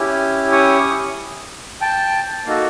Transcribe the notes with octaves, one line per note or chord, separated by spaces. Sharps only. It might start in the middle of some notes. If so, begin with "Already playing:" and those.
Already playing: C#4 E4 G4
C#6 D#6
G5 A5
A#3 D#4 F#4 A4